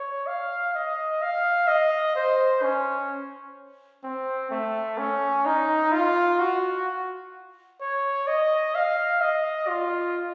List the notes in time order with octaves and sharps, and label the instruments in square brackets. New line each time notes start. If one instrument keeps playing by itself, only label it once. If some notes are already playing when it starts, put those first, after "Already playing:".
Already playing: [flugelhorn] C#5
F5
D#5
F5
D#5
C5
C#4
C4
A3
C#4
D#4
F4
F#4
C#5
D#5
F5
D#5
F4